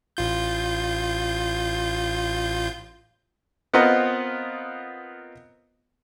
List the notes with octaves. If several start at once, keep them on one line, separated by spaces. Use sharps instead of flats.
A1 F4 G6
B3 C4 F4 A#4 D#5 F#5